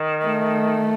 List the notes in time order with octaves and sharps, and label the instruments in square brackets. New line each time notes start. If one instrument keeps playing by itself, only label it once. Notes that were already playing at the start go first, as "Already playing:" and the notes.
Already playing: [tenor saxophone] D#3
[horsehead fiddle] A3